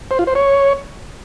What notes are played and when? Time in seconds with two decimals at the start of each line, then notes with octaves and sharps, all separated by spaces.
0.11 C5
0.19 F4
0.27 C5
0.35 C#5